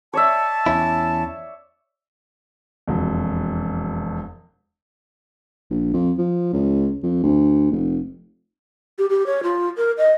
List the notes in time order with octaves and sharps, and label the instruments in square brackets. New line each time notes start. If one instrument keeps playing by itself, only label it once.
[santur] C#5 D5 E5 [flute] A5
[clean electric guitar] E2 C#4 E4
[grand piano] E1 F2
[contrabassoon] A#1
F2
F3
C#2
F2
D2
F1
[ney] G4
G4
C#5
F4
A#4
D#5